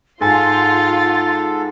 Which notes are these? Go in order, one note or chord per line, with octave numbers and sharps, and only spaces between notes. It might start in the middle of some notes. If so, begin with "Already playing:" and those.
G#2 F4 A4 G5 G#5 C6 A6